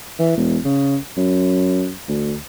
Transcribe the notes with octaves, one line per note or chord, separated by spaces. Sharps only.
E3
E1
C#3
F#2
D2